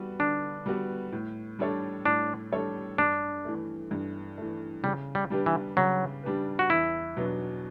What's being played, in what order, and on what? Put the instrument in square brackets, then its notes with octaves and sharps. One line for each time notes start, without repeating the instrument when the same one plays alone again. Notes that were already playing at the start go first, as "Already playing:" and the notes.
Already playing: [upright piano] G3 B3 F#4 B4
[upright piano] D3 [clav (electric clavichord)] D4
[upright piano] G3 B3 F#4 B4
A2
G3 D4 A4 C#5
[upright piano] A2 [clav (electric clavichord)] D4
[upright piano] G3 D4 A4 C#5
[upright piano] G2 [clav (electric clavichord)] D4
[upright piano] E3 A3
G2
E3 A3
[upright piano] C#3 [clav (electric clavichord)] G3
[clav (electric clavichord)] G3
[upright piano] G3 D4 G4 B4
[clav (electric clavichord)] E3
[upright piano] C#3 [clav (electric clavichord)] F#3
[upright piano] G3 D4 G4 B4
[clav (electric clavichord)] F#4
[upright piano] E2 [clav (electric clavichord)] E4
[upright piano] B2 F#3 B3 D4